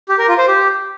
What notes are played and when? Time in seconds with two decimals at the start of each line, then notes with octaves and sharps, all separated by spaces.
0.09 G4
0.18 A#4
0.28 F4
0.38 C5
0.48 G4